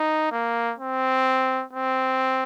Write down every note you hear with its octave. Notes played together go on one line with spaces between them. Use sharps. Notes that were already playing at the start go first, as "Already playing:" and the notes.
Already playing: D#4
A#3
C4
C4